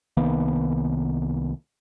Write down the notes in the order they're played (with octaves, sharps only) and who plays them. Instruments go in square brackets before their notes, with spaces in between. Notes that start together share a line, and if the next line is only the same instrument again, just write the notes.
[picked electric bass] C2 D#3 A#3 B3